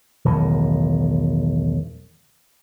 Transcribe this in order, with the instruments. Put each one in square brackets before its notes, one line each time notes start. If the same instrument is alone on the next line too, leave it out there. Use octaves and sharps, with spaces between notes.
[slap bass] E1 B1 A2 D#3